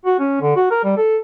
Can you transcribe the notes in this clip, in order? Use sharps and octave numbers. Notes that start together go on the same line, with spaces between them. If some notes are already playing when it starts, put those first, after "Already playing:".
F#4
C#4
D3
F#4
A#4
G3
A4